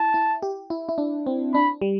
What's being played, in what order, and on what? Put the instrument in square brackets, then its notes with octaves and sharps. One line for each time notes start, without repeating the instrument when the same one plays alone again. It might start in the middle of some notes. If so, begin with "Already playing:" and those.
Already playing: [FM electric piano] E4 [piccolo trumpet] A5
[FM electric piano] E4
G4
E4
E4
D4
C4
[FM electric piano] D4 [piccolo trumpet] B5
[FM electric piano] G3